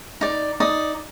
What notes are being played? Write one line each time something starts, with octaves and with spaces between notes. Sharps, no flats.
D#4 D5
D#4 D5 D#6